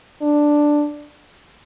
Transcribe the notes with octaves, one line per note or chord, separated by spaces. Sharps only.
D4